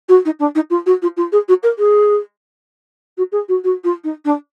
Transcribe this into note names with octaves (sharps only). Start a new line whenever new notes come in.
F#4
D#4
D4
D#4
F4
F#4
F4
F4
G#4
F#4
A#4
G#4
F#4
G#4
F#4
F#4
F4
D#4
D4